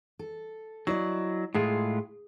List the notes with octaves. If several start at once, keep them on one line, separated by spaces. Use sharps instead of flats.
A4
F#3 E4 D5 D#5
A2 G#3 F4 G#4